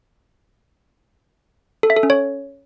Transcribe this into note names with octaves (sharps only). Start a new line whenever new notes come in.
A4
E5
A4
C#4
C#5